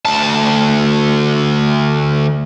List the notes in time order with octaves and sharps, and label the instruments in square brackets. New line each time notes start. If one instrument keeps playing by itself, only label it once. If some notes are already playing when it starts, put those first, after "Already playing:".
[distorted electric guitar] D2 A5